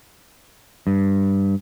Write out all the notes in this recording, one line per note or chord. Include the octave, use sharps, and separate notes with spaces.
G2